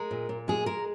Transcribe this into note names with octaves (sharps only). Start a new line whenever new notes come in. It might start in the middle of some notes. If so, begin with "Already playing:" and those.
Already playing: G#3 A#4
A#2
A#2
G#3 G#4
G#3 A#4